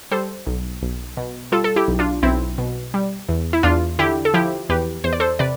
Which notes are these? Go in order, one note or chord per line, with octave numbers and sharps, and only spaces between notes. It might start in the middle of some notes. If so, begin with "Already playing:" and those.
G3 A4 C5
B1
B1
B2
G3 F4 A4
A4
E4 G4
B1
D4 F4
B1 C4 E4
B2
G3
E2
E4
E2 D4 F4
D3 E4 G4
A4
F3 E4 G4
E2 G4 B4
E2 C5
D5
A4 C5
C3 B4 D5